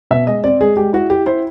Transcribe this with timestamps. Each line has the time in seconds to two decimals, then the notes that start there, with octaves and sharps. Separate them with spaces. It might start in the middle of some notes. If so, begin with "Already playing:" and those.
0.11 B2 E5
0.27 G#3 D#5
0.44 C4 D5
0.61 G#3 G#4
0.77 G#3 G4
0.93 E4 F#4
1.10 E4 G4
1.26 E4 C5